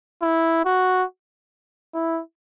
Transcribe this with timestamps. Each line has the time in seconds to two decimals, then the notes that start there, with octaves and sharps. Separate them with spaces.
0.22 E4
0.65 F#4
1.94 E4